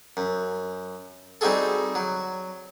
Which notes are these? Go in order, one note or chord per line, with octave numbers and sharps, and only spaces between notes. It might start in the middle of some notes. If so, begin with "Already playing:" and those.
F#2
G3 C4 D#4 F#4 G#4 A4
F#3